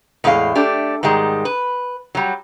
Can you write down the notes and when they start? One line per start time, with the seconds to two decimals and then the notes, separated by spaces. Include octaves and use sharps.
0.24 E2 A2 G#3 D#4 F5
0.55 A3 D4 G4
1.03 G#2 D#3 G3 G#3
1.45 B4
2.15 F#3 G3